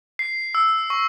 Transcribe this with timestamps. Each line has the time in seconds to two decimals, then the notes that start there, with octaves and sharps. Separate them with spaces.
0.19 C7
0.55 E6
0.90 C#6